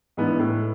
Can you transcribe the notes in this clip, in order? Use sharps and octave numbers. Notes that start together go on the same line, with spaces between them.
G#2 E3 B3 D4
A2